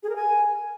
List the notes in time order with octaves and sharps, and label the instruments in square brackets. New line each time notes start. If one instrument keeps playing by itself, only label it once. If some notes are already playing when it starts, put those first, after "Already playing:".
[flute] G#4
A#4
G#5